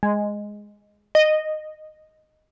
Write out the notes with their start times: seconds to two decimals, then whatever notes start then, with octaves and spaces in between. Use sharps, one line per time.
0.03 G#3
1.15 D#5